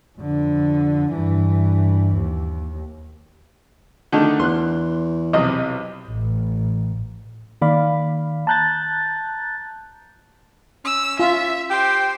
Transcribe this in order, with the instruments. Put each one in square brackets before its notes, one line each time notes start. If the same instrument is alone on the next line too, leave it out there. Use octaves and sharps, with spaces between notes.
[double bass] F2 D3
G2 E3
D#2
[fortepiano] D3 D#3 A3
[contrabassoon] E2 [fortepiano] C6 F#6
[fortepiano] B1 C3 D#5
[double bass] A1
[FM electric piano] D#3 A#3 D5 F5 B5
A5 A#5 F#6 G6 A6
[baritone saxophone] C#4 [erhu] E6
[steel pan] F4 [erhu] E5
[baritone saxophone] G4 [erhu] C5 [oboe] G5